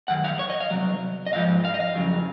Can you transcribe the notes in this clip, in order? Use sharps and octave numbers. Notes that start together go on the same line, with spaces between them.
F#2 D#3 F#5
F5
C#5
D#5
F5
C2 A#2 F#3
D#5
G#2 F3 F5
F5
D#5
F5
F2 C#3 F#3